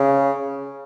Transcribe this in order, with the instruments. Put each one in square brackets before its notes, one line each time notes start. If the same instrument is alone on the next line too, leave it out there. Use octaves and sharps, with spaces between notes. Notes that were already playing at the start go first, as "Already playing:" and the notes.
Already playing: [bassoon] C#3